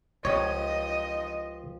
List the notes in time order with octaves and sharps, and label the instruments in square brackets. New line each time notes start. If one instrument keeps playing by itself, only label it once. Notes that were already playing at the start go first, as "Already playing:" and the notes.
[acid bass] C#2 [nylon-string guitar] F3 G4 [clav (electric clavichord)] C#5 [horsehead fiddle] D#5